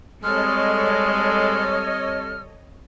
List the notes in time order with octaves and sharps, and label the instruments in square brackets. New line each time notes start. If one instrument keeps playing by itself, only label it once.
[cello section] G3 C4 A4 [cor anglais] G#3 [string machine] C#5 D#5 [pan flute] F6